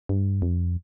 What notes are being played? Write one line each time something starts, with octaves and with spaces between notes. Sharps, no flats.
G2
F2